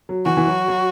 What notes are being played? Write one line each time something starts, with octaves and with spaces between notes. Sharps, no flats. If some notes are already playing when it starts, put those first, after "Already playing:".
F#3
E3 F#4
E3
F#3
F#3